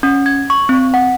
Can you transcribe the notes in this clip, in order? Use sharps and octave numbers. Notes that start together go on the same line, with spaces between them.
C#4
G#6
C#6
C4
F#5